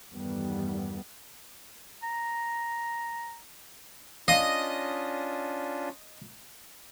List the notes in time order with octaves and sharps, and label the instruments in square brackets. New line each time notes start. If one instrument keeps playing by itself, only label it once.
[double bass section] E2 G2 D#3 G3 A3 B3
[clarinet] A#5
[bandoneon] C#4 D4 F4 [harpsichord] D#5 [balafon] F5